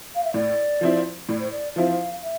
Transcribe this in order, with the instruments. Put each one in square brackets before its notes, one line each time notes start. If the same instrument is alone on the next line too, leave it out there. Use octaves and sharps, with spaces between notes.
[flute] F5
E5
[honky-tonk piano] A2 [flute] D5
[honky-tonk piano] F3 C4 E4
[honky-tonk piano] A2 [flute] D5
[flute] C5
D5
[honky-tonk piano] F3 C4 E4 [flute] F5
[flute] E5